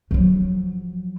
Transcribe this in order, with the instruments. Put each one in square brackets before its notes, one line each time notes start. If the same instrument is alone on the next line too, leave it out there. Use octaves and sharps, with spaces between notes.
[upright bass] F3 F#3